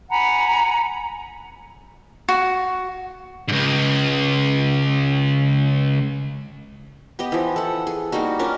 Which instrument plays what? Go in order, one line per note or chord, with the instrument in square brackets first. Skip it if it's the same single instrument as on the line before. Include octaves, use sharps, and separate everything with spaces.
[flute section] F#5 G#5 A#5 B5
[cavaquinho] F#4
[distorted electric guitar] C#2 G#2
[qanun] B3 G4 D#5
E3 F3
A4 F#5
G#4
G3 A#3 D#4 F#4
C#4 D4 F4 A#4